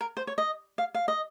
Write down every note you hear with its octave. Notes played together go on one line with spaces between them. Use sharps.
A#4
C5
C#5
D#5
F5
F5
D#5